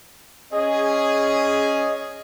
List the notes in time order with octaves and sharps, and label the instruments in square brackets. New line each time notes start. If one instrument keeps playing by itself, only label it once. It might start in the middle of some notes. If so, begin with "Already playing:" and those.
[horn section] C#4 G#4 [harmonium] D#5